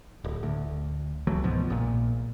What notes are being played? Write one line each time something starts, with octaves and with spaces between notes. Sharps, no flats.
D1
D2
C#2 E3 F#3 A3
C#2 G#2 B2 F3
A#1 A#2